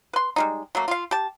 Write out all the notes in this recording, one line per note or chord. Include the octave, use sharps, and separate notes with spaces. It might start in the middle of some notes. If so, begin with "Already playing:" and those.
B4 C6
G3 G#3 D#4
F#3 A3 A#3
F4 F5
G4 A5